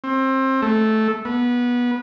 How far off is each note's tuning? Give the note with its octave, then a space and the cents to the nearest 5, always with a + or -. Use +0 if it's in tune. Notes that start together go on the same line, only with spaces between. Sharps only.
C4 +25
A3 -10
B3 -20